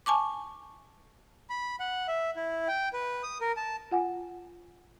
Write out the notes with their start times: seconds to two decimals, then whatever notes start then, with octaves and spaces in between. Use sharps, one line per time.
0.06 G#5 A5 C#6 D6
1.50 B5
1.80 F#5
2.08 E5
2.36 E4
2.68 G5
2.93 B4
3.23 D#6
3.41 A#4
3.57 A5
3.91 F4 F#5 G#5